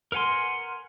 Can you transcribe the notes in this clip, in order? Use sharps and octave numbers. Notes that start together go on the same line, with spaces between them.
A#4 B4 F#5 G#5 C6